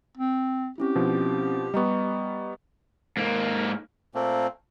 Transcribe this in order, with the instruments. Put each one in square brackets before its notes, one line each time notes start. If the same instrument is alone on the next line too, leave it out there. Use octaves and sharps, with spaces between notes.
[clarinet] C4
[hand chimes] C4 C#4 E4 [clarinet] G4
[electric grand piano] B2 F3
[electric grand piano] G3 B3 [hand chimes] D#5 A#5 C#6
[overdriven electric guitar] G#2 A#3
[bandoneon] A#2 A3 A#3 C4